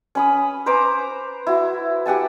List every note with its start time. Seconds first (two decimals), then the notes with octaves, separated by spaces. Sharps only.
0.15 C#4 B5 D#6
0.66 B4 C5 A#5 D6
1.47 E4 F#4
2.06 G4 F#5 G#5 A5